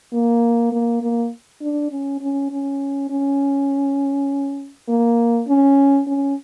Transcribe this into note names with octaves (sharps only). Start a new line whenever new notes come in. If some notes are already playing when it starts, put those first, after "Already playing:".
A#3
A#3
A#3
D4
C#4
C#4
C#4
C#4
A#3
C#4
C#4